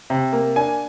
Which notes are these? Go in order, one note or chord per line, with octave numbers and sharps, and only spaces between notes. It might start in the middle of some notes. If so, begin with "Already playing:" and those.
C3
A#3
D4 G#5